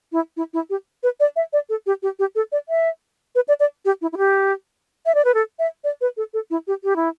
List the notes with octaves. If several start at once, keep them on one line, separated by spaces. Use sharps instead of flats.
E4
E4
E4
G4
B4
D5
E5
D5
A4
G4
G4
G4
A4
D5
E5
B4
D5
D5
G4
E4
E4
G4
E5
D5
B4
A4
E5
D5
B4
A4
A4
E4
G4
G4
E4